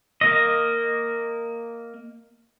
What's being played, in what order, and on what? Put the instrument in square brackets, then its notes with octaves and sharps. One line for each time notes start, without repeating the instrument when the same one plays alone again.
[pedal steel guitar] A#3 D#5